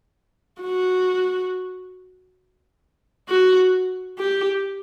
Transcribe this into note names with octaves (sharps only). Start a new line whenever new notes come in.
F#4
F#4
G4